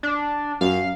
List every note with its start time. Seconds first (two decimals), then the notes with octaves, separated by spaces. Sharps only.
0.03 D4
0.61 F#2 F5